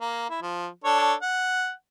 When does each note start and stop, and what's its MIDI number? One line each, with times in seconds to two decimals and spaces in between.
0.01 0.29 58
0.30 0.40 64
0.42 0.68 53
0.84 1.14 62
0.84 1.14 69
0.84 1.14 73
1.22 1.72 78